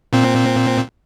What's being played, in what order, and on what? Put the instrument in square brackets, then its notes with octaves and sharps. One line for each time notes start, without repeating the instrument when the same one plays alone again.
[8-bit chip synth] A#2 C4